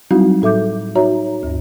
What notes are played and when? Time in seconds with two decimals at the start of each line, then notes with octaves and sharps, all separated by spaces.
0.11 F#3 G3 C4 D#4 E4 F#4
0.42 A2 A4 E5 D6 G6
0.95 D#4 F#4 C#5 E5 A#5
1.43 D2 G2